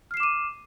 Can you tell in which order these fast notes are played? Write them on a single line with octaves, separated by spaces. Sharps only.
F6 C7 E7 D6 D#7